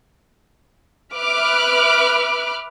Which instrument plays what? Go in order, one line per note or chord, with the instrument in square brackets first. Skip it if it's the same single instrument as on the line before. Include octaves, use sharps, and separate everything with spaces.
[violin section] B4 E5 B5 D6 F6 F#6